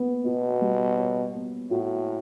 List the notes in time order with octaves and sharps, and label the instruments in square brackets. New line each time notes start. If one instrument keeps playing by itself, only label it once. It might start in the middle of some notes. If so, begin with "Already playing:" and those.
Already playing: [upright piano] B3
[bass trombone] B2 [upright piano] F#4
[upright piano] G3
C#5
B3
[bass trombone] A2 [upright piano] F#4